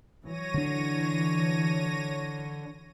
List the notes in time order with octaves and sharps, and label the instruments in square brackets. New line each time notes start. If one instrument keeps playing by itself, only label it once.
[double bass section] E3 F#3 [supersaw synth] C#5 A#6 D#7
[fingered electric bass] D3 D4